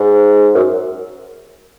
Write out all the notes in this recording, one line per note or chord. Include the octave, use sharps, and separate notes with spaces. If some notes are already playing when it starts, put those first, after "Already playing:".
Already playing: G#2
F#2